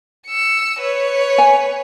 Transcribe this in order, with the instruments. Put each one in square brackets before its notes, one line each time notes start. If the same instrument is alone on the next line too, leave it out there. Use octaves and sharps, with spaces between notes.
[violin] E6 C#7
B4 C#5
[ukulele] G#5